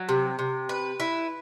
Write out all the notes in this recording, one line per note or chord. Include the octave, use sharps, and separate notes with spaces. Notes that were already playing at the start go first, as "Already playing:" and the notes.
Already playing: F#3
C3
C3
B4
E4